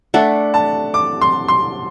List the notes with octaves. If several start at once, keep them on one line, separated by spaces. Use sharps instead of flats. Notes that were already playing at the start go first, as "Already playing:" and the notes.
A3 D4 A4 F#5
A5
D6
C6
C6